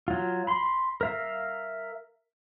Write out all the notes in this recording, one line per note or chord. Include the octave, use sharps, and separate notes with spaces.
F#3 F4
B5 C6
A#4 E5 F5